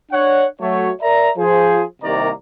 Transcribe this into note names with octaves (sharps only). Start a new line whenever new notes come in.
D4 C#5 F#5
F#3 A3 C#5
A#4 D5 E5 A#5
F3 G#4 C5
C2 C3 D#3 A#3 D5 A#5